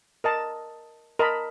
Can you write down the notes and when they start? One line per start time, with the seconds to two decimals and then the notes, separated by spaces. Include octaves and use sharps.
0.24 A#4 D#5 A5
1.19 A#4 D#5 A5 B5